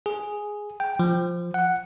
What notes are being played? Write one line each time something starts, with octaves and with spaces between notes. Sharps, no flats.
G#4
G5
F3
F#5